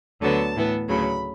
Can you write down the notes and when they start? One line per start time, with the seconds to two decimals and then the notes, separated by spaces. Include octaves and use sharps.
0.21 D2 D3 F#3 B3 A5
0.55 A2 E3 B3
0.88 D2 C#3 F#3 B5